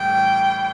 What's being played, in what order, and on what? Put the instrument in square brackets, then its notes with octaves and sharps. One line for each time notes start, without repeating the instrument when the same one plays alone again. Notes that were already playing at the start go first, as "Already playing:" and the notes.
Already playing: [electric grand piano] A2 E3 G3 [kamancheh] G5